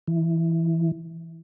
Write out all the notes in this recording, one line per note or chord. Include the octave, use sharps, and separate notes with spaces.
E3